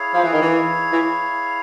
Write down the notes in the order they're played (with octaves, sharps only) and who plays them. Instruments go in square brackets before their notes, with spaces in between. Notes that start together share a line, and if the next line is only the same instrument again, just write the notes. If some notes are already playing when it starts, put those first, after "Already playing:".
Already playing: [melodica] E4 G#4 C#5 F5
[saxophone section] F3
E3
D#3
E3
E3